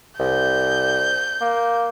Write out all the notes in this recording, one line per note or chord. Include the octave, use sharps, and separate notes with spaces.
C2 G6
A#3